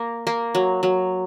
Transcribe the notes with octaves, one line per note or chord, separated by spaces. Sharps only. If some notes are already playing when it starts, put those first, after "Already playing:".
Already playing: A#3
A#3
F#3
F#3